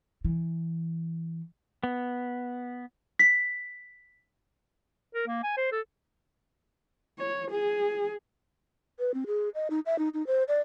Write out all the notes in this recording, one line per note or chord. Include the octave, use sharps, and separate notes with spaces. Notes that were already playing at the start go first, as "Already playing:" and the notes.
E3
B3
B6
A#4
A#3
G#5
C5
A4
C#5
G#4
B4
C4
G#4
D#5
D#4
E5
D#4
D#4
C5
D5